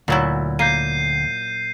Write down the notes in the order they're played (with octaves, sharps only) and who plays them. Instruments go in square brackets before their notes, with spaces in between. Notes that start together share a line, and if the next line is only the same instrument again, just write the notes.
[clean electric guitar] D2 [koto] A#2 F#3 E4
[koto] A#3 [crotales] G6 C7 D#7